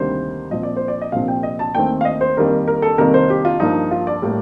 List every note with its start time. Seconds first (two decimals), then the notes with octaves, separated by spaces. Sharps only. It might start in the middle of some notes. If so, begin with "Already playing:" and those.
Already playing: D2 C3 D#3 G3 A#3 C5
0.51 A#2 F3 C4 D#5
0.63 D5
0.76 C5
0.88 D5
1.01 D#5
1.12 C2 A#2 F3 C4 F5
1.28 G5
1.43 D#5
1.59 A5
1.75 D#2 D#3 A3 C4 G5
2.01 F5
2.05 D#5
2.21 C5
2.37 F2 D#3 G3 A#3 A#4
2.68 A#4
2.82 A4
2.98 F2 C3 D#3 G3 A#3 A#4
3.14 C5
3.30 G4
3.45 F4
3.60 G2 F3 A#3 D#4
3.91 F4
4.07 D5
4.22 A2 G3 A#3